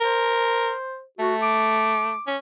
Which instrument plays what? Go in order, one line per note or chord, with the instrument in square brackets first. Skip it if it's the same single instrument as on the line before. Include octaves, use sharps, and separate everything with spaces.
[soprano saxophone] A#4 [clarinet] C5
[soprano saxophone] A3 [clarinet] F#4
[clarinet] D6
[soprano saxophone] C#4